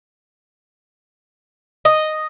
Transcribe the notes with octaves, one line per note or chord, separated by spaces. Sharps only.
D#5